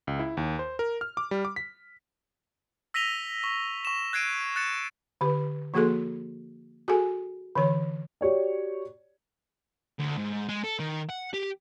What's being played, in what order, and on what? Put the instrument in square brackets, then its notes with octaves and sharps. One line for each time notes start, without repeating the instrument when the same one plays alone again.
[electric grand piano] C#2
E4
D#2
C5
A#4
F6
D6
G3
D6
B6
[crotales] E6 A#6 B6 D#7 F7 G7
C#6
C#6 E7
F#6 G#6 C7 D7 D#7
F#6 A6 C#7 E7
[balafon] D3 G4 B4
F3 A#3 F#4 G#4 A4 C6
F#4 G#4 A4 G#5
D3 E3 C#5
[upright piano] F#4 G4 C#5 D5
[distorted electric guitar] D2
G#2
G#3
A4
D#3
F#5
G4